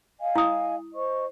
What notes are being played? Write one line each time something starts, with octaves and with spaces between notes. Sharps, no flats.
D#5 F5 G#5
E4 D#6
C5 D#5 C#6